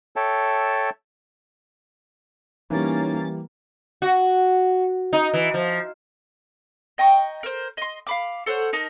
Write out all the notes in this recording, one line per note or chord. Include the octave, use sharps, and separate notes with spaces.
A4 C#5 E5 G5 A5
E3 G3 A#3 C#4 D#4 A6
F#4
D#4
E3
F3
D#5 G5 A#5 C#6
A#4 C5
D#5 C6
F5 B5 D6
A4 C5 C#5 F#5
D#4 A#4 A5